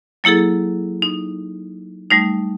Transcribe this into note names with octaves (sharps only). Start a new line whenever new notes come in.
F#3 A#3 E4 G#4 A4
D#4
G3 A3 D#4